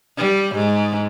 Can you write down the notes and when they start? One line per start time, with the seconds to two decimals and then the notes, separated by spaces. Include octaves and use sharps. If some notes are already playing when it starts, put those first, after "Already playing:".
0.18 G3
0.56 G#2